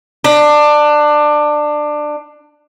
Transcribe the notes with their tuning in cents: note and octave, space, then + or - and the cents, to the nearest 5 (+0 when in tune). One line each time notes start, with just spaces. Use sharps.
D4 +20